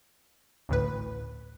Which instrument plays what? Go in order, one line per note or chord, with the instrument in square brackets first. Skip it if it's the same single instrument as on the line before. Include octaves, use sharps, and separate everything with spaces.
[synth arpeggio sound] A1 D2 A2 B4